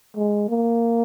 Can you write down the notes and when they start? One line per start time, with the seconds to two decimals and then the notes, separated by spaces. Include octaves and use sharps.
0.16 G#3
0.49 A#3